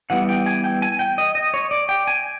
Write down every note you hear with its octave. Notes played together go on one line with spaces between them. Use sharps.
E3 G3 B3 F#5
G5
G#5
G5
G#5
G5
D#5
D#5
C#5
D5
G5
G#5